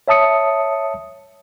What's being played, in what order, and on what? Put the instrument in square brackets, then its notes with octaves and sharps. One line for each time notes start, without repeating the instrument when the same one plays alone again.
[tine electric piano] C#5 E5 A5 D#6 C#7